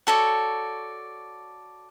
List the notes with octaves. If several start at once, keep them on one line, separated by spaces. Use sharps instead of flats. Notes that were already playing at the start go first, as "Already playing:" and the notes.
F#4 A4 C#5 D5